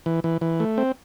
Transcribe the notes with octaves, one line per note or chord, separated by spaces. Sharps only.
E3
E3
E3
A3
C4